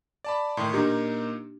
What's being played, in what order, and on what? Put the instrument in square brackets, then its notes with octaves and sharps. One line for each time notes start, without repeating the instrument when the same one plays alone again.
[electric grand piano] D5 A5 B5
[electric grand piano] A2 D#3 [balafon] C6
[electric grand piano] A#2 A#3 D#4 [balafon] D4 G4